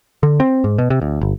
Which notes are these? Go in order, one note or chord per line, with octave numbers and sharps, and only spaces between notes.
D3
C4
G#2
B2
C3
D2
G1